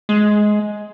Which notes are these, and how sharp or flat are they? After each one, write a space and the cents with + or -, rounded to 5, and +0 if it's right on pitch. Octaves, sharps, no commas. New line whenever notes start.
G#3 +15